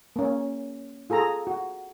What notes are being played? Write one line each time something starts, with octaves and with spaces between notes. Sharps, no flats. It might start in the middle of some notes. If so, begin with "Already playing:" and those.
A#3 C#4
F4 G#4 A4 A#5
F#4